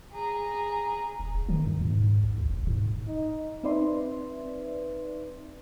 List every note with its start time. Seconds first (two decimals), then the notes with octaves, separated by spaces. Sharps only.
0.12 G#4 A#5
1.20 D#1
1.34 D1
1.49 D#3
1.66 E2
1.81 G#2
2.24 G#1
2.38 C#2
2.49 D1
2.67 G#2
3.07 D#4
3.64 C4 D#4 B4 D5 E5 C6